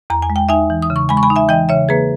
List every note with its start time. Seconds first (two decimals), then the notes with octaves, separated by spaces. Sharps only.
0.10 E2 A#5
0.22 G#5
0.30 G#3
0.36 G5
0.49 D#4 E5 G#5
0.70 E3
0.82 D#6
0.90 C#3
0.96 C#6
1.09 G#3 G#5 B5
1.17 C#6
1.23 G#5 B5
1.30 D#4
1.36 E5 G#5
1.49 E3 D#5 G5
1.69 C#3 C#5 E5
1.89 A#3 G#4 B4